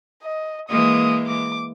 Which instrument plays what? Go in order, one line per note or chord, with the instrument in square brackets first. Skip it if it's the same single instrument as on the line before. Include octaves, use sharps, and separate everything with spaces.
[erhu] D#5
[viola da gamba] E3 G#3 A#3 [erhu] D#6
[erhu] D6